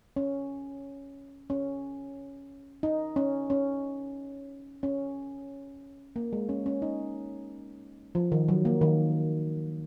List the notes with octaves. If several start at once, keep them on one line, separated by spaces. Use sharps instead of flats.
C#4
C#4
D#4
C#4
C#4
C#4
A#3
G#3
C#4
C#4
D#4
F3
D#3
F#3
A#3
D#3